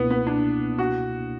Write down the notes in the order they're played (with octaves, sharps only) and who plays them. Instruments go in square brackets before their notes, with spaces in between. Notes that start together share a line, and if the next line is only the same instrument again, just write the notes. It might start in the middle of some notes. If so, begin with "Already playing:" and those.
Already playing: [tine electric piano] C#2 B2 A#3 E4 [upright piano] B3
[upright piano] B3
D4
F#4